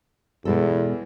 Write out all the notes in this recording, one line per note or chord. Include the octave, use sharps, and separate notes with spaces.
E2 B2 G#3 A4